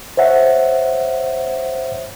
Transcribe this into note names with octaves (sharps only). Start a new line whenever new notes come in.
C5 C#5 E5 F#5